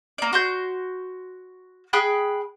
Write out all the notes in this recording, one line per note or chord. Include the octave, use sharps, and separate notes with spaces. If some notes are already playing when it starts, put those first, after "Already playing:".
A#3 D5
F#4 C6 G6
G#4 G5 B5 F#6